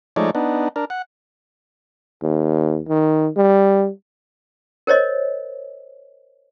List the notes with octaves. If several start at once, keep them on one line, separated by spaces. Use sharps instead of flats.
F3 G#3 A3 D#4 C#5 D5
B3 D4 D#4
D4 A#4
F#5
D#2
D#3
G3
A#4 C5 C#5 D#5